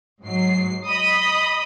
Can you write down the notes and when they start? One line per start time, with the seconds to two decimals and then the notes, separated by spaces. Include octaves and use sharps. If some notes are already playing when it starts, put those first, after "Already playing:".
0.22 G#2 F#3 C7
0.87 D#5 B5 D#6